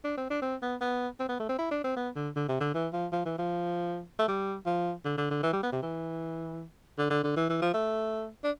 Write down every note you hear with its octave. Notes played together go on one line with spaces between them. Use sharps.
D4
C4
D4
C4
B3
B3
C4
B3
A3
C4
E4
D4
C4
B3
D3
D3
C3
D3
E3
F3
F3
E3
F3
A3
G3
F3
D3
D3
D3
E3
G3
B3
C3
E3
D3
D3
D3
E3
E3
F3
A3
D4